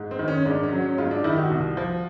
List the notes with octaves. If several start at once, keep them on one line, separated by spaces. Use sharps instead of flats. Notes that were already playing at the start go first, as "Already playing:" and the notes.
Already playing: G#2
C4
D#3
C#4
G#2 D4
C#4
F#3
C#4
G#2 F4
D4
D#3 E4
G4
F#4
C2
F3